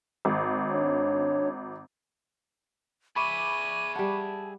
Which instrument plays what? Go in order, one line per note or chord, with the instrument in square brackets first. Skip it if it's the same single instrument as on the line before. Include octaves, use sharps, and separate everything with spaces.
[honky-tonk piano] G#1
[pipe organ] D4 C#5
[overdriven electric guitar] G#4 E5 [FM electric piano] B5 C#6 D6 [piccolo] D#7
[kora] G3 F#5 [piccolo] A5